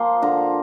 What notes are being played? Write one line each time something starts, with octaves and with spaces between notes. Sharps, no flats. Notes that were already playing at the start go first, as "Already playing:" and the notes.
Already playing: F3 A#3 C6
D3 A#5